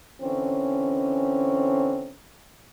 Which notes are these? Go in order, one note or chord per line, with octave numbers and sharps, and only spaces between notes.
D3 E3 C4 C#4